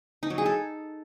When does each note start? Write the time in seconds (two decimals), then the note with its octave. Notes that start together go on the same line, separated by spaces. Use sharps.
0.23 D#4
0.30 F#3
0.38 G#4
0.46 A4